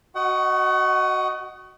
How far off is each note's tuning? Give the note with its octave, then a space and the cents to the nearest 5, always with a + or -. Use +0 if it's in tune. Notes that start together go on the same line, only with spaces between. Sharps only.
F#4 +0 D#5 +0 F#5 +35